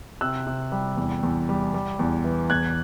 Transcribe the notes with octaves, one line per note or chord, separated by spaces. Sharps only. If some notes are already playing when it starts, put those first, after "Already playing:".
C3 E6 F#6
C3
G3
E2
E2
G3
G3
E2
E3
E2 F#6 G#6